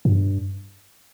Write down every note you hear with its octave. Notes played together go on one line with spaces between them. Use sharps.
G#2
G2